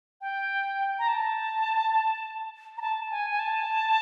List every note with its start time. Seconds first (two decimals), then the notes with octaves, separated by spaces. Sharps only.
0.21 G5
0.99 A#5
1.08 A5
2.77 A#5
2.81 A5
3.10 G#5
3.31 G#5
3.39 A5